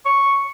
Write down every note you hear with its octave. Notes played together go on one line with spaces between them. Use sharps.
C#6